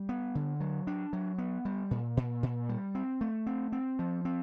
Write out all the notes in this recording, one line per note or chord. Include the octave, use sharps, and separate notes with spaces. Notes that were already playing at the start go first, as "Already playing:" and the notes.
Already playing: G3
B3
D3
F#3
D4
F#3
B3
G3
A#2
A#2
A#2
G3
C4
A3
C4
C4
F3
C4